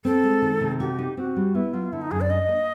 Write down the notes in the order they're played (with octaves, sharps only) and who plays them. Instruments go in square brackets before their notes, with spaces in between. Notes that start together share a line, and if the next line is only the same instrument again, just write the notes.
[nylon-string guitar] C4 [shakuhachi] A4
[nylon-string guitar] G#3
D#3
C3
[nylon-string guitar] F#4 [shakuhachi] G4
[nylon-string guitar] D#4
[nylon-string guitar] C4 [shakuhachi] F#4
[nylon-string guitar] G3
[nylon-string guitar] B3 [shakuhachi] E4
[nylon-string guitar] F#3 [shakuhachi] F4
[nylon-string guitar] D3 [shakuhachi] E4
[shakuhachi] D#4
[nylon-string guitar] F#2 [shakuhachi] G#4
[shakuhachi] D5
[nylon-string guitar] D4 [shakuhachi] D#5
[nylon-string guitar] A#3